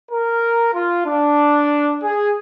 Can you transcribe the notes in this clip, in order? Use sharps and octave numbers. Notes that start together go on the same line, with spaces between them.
A#4
F4
D4
G#4